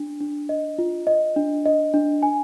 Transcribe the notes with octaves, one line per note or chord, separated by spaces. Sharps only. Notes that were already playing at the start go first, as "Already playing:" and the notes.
Already playing: D4
D4
D#5
F4
D#5
D4
D#5
D4
G#5